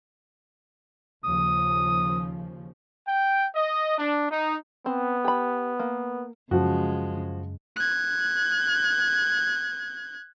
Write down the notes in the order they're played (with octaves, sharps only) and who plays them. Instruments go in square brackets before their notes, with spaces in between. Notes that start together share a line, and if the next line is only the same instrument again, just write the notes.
[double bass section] D#2 C#3 F3 [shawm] D#6
[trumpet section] G5
D#5
D4
D#4
[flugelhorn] B3 [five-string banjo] C4
[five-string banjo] G4 B5
A#3
[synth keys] F#2 [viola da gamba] C#3 G#3 [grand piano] F3 F#4
[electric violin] F#6 G#6